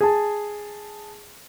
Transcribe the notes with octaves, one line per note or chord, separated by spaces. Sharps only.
G#4 A5